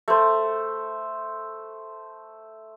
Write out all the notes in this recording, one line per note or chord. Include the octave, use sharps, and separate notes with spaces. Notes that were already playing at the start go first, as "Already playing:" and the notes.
A3 C5